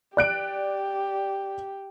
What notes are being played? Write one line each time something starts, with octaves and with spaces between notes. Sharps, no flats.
G4 D5 F#6 D7